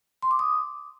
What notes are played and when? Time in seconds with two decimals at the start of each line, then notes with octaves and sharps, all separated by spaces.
0.22 C6
0.31 D6
0.39 D#6